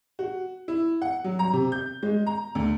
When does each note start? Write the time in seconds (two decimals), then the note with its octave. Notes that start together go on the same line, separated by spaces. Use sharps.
0.19 F#4
0.68 E4
1.02 F#5
1.24 F#3
1.39 A#5
1.53 C3
1.72 G6
2.03 G#3
2.26 A#5
2.55 D2